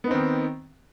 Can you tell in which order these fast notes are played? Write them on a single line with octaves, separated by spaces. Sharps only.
B3 D#4 C4 D#3